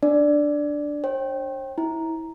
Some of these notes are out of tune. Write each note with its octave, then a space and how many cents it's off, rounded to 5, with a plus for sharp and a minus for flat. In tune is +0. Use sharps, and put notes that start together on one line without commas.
D4 +0 D5 +0
C5 +45 G5 +0
E4 -20 A#5 +0